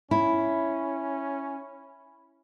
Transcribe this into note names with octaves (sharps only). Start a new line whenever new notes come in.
C#4 E4 B5